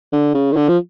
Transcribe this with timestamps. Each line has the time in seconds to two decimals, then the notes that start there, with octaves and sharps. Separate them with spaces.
0.13 D3
0.34 C#3
0.52 D#3
0.56 D3
0.69 F3